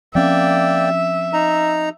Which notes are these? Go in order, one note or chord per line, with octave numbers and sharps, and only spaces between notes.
F3 A#3 C4 C#4 D5 E5 G5
D#4 A#5